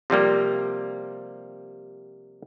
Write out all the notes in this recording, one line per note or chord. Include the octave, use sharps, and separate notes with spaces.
C3 F3 G3 A#3